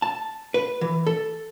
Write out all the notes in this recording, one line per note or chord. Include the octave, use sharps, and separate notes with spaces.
A5
B4
E3
A4